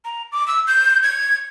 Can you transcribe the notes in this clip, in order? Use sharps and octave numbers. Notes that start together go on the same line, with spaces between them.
A#5
D6
E6
G6
G#6